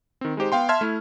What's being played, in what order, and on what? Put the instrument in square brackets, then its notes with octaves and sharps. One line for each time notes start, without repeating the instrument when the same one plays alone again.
[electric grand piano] D#3 C4
G#3 D#4 G4 C5
B3 F5 G5 C6
E5 A5 C6 F6 G#6
A3 E4